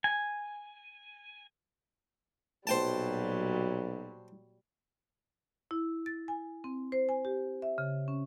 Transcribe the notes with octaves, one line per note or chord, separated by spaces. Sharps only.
G#5
B1 A#2 F#3 G3 C5 G5 A5
E4
A6
G#5
C4
C5
G#5
G4
E5
C#3
C#4